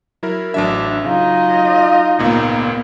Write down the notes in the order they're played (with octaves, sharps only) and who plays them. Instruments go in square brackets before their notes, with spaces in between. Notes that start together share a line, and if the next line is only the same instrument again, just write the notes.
[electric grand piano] F#3 E4 A#4
[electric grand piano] A1 F#3 E5 [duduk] D4
[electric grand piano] C#3 [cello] F#3 [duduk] D#4 [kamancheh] F4 D#5
[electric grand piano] G#1 C#2 A#2 [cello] A#3 B3